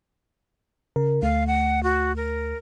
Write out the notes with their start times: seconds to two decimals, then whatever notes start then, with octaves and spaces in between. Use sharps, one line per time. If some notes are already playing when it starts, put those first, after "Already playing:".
0.96 C#3 A#4
1.22 D2 A3 F5
1.47 F#5
1.83 F#4
2.16 A#4